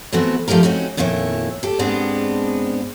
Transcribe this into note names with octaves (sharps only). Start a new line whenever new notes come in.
E3 A3 B3 C4 F#4
F3 A3 D#4 G4 A#4
C4 C#4 D#4 F#4
F2 A#2 D#3 E4 C#5
G4 A4
G#2 G#3 B3 C4 D4